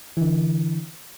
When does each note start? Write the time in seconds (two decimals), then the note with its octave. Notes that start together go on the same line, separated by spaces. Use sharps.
0.17 D3 E3